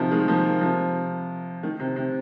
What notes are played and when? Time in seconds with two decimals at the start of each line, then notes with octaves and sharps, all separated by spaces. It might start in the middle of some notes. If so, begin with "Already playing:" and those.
Already playing: C3 D#3 F3
0.11 D#3 G#3
0.28 F3 A#3
0.61 C3 F3
1.63 D#3
1.80 C3
1.96 C3